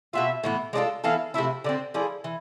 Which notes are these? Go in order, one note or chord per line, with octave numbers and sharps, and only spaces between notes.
B2 B3 F4 E5
A2 E3 B3
G#3 D4 F4 A4 D5
E3 B3 E4 A4 F5
C3 F3 A3 E4 E5
D3 A3 C4 D5
F3 A3 E4 G#4 D5
E3